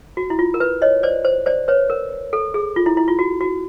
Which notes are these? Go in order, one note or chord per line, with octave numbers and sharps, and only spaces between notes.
F#4
E4
F4
A#4
B4
C#5 D#5
C5 D5
C5
C5 D5
B4 C#5
A#4
A4
G#4
F4
E4
E4
F4
F#4
F#4